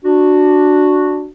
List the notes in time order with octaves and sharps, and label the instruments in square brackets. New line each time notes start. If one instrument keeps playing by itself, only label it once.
[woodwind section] D4 F#4